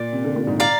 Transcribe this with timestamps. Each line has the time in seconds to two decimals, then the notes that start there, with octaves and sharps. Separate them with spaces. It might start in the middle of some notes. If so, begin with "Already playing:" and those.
Already playing: A#2 D5
0.13 C3
0.24 D3
0.36 A#2
0.47 G#2
0.60 D5 F5 A#5